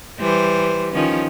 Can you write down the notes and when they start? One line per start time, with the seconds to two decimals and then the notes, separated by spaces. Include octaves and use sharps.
0.20 E3 G3 C5
0.93 D#3 F3 C#4